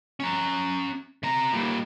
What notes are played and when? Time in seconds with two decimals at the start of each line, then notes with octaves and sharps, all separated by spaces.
0.20 C#4 A#5
1.23 C3 A#5
1.53 A#2 G3